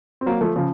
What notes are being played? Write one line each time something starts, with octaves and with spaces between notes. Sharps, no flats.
C4
F#3 A#3
F3 A3
C#3 F3